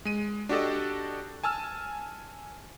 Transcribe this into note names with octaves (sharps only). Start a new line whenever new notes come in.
G#3 D#7
D4 F#4 G4 A4 D5 D#5
G#5 A5 E6 F6